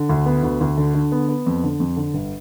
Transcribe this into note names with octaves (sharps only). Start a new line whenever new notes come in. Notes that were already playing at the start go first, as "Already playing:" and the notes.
Already playing: D3
D2
B3
D2
D2
D3
D3
B3
B3
F2
D3
F2
D3
G1